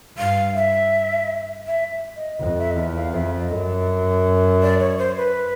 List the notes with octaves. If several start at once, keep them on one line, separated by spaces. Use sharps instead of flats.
G2 F5
E5
E5
E5
D#5
F2 D#5
E5
D#5
E2 E5
F5
F2 E5
D#5
F#2
D5
C#5
C5
B4